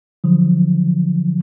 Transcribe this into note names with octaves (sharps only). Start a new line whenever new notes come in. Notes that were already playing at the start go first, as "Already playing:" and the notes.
D3 F3 F#3